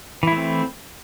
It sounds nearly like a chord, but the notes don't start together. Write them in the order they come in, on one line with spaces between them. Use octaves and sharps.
E3 E4 A3 C4